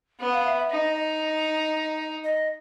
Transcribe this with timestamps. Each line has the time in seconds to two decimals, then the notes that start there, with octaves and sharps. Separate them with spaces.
0.20 B3
0.32 F5
0.45 E5
0.58 E5
0.71 D#4 D#5
0.96 D#5
2.24 D#5